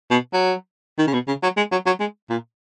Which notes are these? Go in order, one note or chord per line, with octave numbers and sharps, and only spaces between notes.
B2
F#3
D#3
C#3
B2
C#3
F#3
G#3
F#3
F#3
G#3
A#2